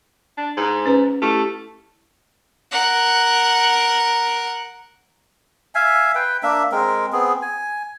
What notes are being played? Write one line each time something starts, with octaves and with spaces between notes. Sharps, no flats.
D4
G#2
C#4 B4
A3 E4 G4
A#4 F#5
E5 F5 G#5
B4 G5
A#3 D4 E5
G#3 C4 A#4
B3 C4 G#4
G#5